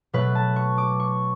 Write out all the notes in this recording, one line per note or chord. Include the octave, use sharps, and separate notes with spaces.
B2 F#3 A3 B4
A5
C#6
D6
C#6